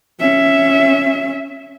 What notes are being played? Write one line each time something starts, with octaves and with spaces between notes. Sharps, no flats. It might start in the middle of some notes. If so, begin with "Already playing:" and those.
C#4 E5